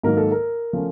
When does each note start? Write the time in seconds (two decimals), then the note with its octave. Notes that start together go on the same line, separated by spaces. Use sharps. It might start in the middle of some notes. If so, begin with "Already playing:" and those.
0.03 G#2 D#3 F#3 A#3 A#4
0.17 A4
0.32 A#4
0.73 F3 A3 C#4